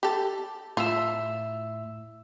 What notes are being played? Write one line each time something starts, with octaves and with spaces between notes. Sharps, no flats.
G4 A4
A2 F4 E5 E6